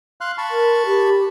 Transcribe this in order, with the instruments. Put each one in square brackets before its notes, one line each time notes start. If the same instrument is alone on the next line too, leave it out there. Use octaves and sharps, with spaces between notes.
[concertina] F5 C6 F#6
A5 B5 C#6
[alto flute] A#4
G4